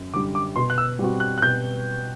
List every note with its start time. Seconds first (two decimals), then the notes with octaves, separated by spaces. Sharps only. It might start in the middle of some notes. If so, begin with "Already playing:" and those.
Already playing: F#2
0.14 D3 G3 D6
0.35 D6
0.56 B2 C6
0.70 F#6
0.78 E6
0.99 G3 C4 F#4
1.20 F#6
1.38 F#6
1.42 B2 G6